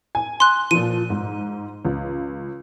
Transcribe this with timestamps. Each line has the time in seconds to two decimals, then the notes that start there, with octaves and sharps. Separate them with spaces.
0.15 G#5
0.40 C6 F#6
0.71 A#2 F3 D#7
1.10 G#2
1.85 C#2